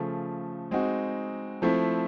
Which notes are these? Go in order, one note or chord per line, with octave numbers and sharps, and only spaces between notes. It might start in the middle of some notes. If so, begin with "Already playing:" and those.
Already playing: C#3 F3 A3
G#3 C4 D#4 F#4
F3 A3 C4 E4